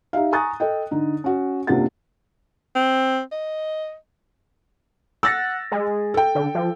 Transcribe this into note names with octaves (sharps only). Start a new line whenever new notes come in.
D#4 G4 E5 F5
G#5 A#5 C#6 D#6 F#6 A6
A4 D#5 G5
D3 D#4
C#4 F#4
F#1 C3 D4 F4 F#5 A6
C4
D#5
F#5 E6 A6 A#6
G#3
A4 G5
D3
F3